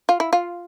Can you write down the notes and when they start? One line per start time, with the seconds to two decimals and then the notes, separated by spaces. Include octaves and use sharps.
0.09 F4
0.20 E4
0.33 F4